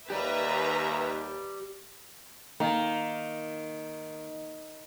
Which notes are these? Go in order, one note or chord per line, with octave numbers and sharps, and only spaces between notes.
D#2 G4 B4 D5 E5 A#5
D#3 A#3